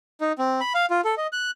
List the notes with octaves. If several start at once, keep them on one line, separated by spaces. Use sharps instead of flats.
D#4
C4
B5
F5
F4
A4
D#5
F#6